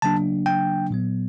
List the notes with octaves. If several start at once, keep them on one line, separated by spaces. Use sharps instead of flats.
C#3 F#3 A#3 D4 A5
G5
A#2 F#3 B3